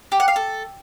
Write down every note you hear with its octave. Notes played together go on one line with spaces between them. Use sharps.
G4
F#5
F5
A4